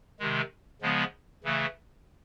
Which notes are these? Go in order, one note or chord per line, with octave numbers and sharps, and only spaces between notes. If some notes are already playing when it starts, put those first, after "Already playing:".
C3 D#3 G#3
C#3 F3 G#3 B3
C#3 E3 A3